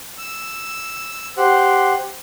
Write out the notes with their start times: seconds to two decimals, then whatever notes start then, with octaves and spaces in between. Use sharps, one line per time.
0.18 E6
1.37 G4 C5 F#5